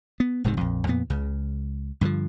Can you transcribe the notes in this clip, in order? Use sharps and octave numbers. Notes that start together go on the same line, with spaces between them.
B3
D#1 G#2 C3 D#3
A#1 F2
F2 A#2 B3
C#2 C#3
G2 D3 D#3 F3